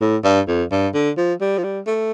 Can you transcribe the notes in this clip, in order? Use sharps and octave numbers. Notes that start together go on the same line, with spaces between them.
A2
G2
F2
G2
D3
F3
G3
F3
G3
A3